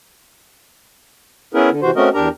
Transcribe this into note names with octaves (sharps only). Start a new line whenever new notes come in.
B3 C#4 E4 G#4 A#4 B4
D3
C3 E3 F#4 C5
A3 C4 C#4 F#4 A#4 D#5
E2 D4 G4 A#4 A#5